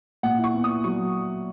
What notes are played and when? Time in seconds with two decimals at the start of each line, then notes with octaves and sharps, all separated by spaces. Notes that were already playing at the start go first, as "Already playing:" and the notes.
0.23 A#2 F#5
0.38 E4
0.44 C#6
0.54 B3
0.64 D#6
0.70 E4
0.84 F#3 C#6